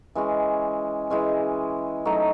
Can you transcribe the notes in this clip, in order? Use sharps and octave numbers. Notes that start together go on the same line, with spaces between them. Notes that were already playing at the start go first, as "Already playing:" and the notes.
E3 G#3 C#4
E3 G#3 C#4
F#3 A3 D#4 F#4